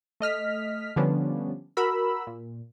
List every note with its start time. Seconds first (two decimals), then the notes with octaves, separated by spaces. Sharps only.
0.20 A3 D#5 F6 B6
0.96 D3 F3 G3 B3 C#4 D4
1.77 F#4 A#4 B5 E6
2.27 A#2